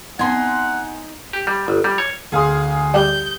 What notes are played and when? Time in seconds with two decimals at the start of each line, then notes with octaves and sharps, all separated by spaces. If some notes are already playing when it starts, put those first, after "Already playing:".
0.19 B3 C4 D#4 F#5 G#5 C6
1.33 G4
1.47 G3
1.68 G1
1.84 G3
1.98 C#5
2.32 D2 G#4 F5 G#5 C6 D#6
2.94 G3 G6